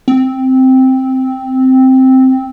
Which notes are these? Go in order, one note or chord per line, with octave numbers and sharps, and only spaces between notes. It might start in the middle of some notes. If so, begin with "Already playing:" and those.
C4